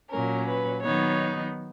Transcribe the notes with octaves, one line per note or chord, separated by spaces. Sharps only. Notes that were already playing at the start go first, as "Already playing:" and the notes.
A#2 F#3 C#4 A#4
B4
D#3 F#3 B3 D#4 C#5